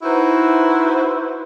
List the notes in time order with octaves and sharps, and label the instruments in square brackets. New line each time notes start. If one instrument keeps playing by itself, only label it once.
[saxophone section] D#4 E4 F#4 B4 C5